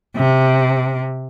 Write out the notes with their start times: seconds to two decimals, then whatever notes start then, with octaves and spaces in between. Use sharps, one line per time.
0.17 C3